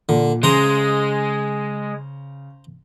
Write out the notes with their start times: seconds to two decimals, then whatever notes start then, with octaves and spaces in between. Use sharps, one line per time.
0.09 A#2 D3
0.43 C#3 G#3 C5 A#5 C6